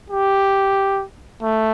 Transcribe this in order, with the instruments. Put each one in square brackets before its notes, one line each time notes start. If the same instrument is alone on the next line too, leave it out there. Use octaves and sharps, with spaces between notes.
[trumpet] G4
A3